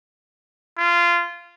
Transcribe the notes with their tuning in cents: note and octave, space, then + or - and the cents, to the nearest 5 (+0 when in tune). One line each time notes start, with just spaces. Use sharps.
F4 -20